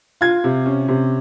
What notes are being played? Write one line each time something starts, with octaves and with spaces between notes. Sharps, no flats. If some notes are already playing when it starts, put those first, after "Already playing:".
F4 G#6
C3
C#4
C3